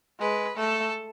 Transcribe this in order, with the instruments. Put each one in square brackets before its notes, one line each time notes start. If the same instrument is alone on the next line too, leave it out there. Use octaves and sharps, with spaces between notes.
[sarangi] G#3 [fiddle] B4
[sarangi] A3 [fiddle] A4